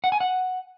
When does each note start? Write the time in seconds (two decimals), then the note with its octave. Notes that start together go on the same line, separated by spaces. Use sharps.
0.04 F#5
0.12 G#5
0.20 F#5